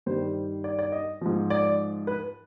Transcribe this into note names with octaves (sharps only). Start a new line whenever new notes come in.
G2 D#3 G3 C5
D5
D5
D#5
G#2 F3
D5
B4